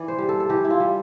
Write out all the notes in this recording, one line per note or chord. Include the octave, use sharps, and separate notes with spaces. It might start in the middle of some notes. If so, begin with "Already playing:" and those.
Already playing: E3 D5
C5
G3
A4
A4
E3 G4
E4
F4
G3